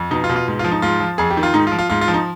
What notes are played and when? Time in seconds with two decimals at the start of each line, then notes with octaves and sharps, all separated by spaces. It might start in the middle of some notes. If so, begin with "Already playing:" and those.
Already playing: F2
0.11 B2 D#4
0.24 F4
0.29 B2
0.36 F4
0.48 G#2
0.59 F4
0.64 F3
0.71 D#4
0.82 G#2 F4
1.00 F3
1.18 F2 G#4
1.30 G4
1.37 D#3
1.43 F4
1.54 G#2 D#4
1.67 F4
1.72 F3
1.79 F4
1.90 G#2 F4
2.01 F4
2.08 F3
2.14 D#4